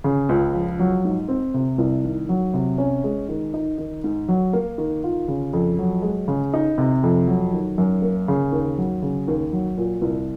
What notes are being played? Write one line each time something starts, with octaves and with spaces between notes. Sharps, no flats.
C#3
C#2
F3
F#3
G#2
C4
C3
C2
D#3
F#3
C3
C#4
G#3
D#3
D#4
D#3
G#2
F#3
A#3
D#3
F4
C#3
F2
F#3
G#3
C#3
D#4
C3
F2
F#3
D#3
F#2
A#3
C#3
D#2
F#3
C#3
D#2
F#3
A#2
C2